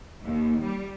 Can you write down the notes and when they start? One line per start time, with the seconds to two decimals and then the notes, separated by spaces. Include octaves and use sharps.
0.25 D#2
0.62 G3